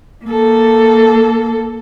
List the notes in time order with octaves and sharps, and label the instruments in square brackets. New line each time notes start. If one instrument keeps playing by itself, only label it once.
[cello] A#3 A4